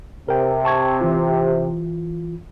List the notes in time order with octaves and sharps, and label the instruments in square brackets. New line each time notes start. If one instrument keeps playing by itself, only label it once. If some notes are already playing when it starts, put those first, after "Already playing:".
[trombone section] C3 [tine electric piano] A#4 G5
[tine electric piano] A5 C#6 G#6
E3 F4